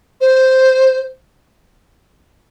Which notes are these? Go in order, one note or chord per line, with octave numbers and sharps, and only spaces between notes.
C5